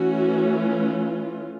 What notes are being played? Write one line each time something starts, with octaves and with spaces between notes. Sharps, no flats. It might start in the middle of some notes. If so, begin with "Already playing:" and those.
Already playing: E3 A3 C#4 F#4
F4